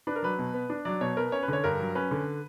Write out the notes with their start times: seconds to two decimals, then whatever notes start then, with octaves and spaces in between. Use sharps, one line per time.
0.07 D4 B4
0.16 A#4
0.23 F#3 B4
0.39 B2
0.54 B3
0.70 D4
0.85 F#3 D5
1.01 B2 C#5
1.17 B3 A#4
1.32 C#4 C#5
1.43 B4
1.48 D3 C#5
1.64 G2 A#4
1.80 F#3
1.95 C#4 B4
2.11 D3